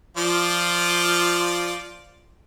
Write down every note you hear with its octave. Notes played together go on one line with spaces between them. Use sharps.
F3 F4 D5